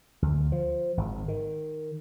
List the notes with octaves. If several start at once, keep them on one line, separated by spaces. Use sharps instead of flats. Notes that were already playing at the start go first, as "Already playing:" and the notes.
D2
F3
G#1
D#3